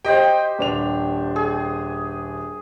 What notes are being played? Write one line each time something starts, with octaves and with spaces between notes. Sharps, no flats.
G4 C5 D#5 G5
D#1 D4 F7
G#4